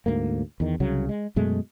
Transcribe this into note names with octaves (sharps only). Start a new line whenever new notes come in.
D2 G#2 A#3
E2 D#3
C2 C#3 F#3
G#3
F#2 B2 G#3 A3